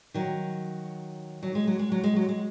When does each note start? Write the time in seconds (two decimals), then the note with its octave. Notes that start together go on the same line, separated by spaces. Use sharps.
0.14 D#3 F#3
1.43 F#3
1.55 G#3
1.67 F#3
1.79 G#3
1.92 F#3
2.04 G#3
2.16 F#3
2.29 G#3